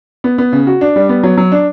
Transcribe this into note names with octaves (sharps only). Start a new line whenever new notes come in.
B3
B3
C#3
F#4
D4
G3
B3
F#3
F#3
D4